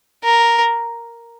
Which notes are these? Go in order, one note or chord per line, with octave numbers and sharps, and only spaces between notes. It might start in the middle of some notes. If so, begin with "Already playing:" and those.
A#4